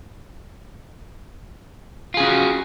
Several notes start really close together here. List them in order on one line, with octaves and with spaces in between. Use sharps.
F4 G#4 C#4 F#4